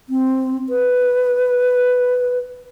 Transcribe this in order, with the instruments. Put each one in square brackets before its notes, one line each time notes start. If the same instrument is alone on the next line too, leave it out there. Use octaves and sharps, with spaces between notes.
[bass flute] C4
B4